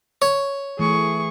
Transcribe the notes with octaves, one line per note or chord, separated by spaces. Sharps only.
C#5
E3 A3 G#4 C#6